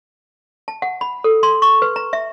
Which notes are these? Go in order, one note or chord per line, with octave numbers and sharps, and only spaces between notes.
A5
F#5
B5
A4
C6
C#6
B4
A#5
E5